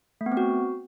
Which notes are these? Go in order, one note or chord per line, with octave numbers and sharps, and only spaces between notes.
A3
B3
C4
F#4